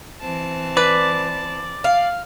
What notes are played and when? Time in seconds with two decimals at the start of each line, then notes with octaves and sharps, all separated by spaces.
0.21 E3 C4 A5
0.77 B4 D5
1.84 F5